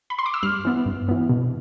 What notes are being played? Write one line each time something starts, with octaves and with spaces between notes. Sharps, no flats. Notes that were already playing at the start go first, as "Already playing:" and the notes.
B5
C6
D6
E6
G2 F6
E3 B3
G2
E3 B3
B2